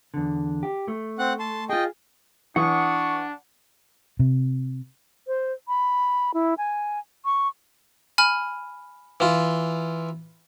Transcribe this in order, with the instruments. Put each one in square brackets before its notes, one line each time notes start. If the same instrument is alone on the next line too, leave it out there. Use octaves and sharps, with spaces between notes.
[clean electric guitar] E2 D3
G4
A3
[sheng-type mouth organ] C4 F#5 F#6
A5 C6
[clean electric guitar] F4 G#4 [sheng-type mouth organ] D#5 G5
[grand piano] E3 [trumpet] D4 [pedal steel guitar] F#5 D#6 [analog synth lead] C#6
[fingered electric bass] C3
[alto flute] C5
B5
E4
G#5
C#6
[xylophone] G#5 B5 F6
[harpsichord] E3 F4